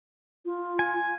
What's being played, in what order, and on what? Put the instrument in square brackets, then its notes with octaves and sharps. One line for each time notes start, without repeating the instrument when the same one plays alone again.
[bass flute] F4
[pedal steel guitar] G#5